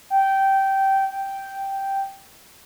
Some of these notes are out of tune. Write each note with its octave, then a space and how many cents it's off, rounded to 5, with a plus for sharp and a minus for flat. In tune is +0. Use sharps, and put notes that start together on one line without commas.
G5 -15
G5 -5